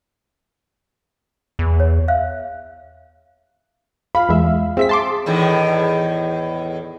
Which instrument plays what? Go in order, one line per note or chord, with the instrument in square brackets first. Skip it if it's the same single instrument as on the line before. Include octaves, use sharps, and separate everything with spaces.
[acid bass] E2
[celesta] C#5
E5 F5 F#6
[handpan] F5 [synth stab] B5
[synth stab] E2 G#3 E5
[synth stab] C4 E5 B6 [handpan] G#4
[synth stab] A5 C6 D6
[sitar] E2 A2 D#3